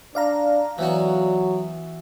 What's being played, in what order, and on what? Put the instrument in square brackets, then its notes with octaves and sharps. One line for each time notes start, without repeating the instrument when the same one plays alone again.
[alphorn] D4 [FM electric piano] D5 F5 A#5
[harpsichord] E3 B3 F#4 [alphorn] F#3